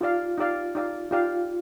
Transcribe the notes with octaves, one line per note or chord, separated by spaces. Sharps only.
D#4 F4 G4 D5 F5
D#4 G4 D5 F5
D#4 G4 D5 F5
D#4 F4 G4 D5 F5